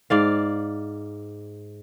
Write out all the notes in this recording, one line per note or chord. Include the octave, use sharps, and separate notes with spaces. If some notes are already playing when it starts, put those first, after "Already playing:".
G#2 D5 F5